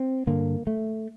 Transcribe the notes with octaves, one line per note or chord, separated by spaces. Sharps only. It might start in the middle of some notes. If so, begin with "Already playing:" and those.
Already playing: C4
G2 D3 A#3
A3